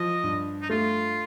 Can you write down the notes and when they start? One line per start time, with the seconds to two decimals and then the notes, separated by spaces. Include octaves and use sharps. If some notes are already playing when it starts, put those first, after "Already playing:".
Already playing: F3 D#5
0.24 G2
0.62 D#4
0.70 A3 F4